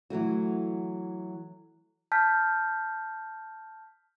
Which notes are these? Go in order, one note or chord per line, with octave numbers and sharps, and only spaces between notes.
E3 F#3 A3 F#4
A5 F6 G6 B6